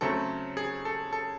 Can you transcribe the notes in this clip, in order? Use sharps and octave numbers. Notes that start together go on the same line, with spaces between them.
C#3 F#3 A3 C4 A4
G#4
A4
A4